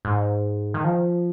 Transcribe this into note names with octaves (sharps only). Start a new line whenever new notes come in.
G#2
D#3
F3